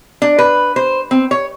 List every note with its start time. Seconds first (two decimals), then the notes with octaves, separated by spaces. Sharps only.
0.22 D4
0.39 B4
0.76 C5
1.11 C4
1.31 C#5